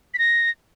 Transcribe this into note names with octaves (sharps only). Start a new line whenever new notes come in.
B6
A#6